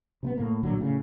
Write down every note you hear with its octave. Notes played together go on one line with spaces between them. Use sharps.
C3 A#3 B3
A2 A#3
A#1 A#2 D3 F#3
A2 C#3